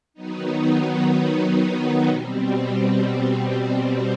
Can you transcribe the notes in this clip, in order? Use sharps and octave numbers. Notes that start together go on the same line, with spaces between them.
D#3 F#3 B3 D#4
B2 G3 C4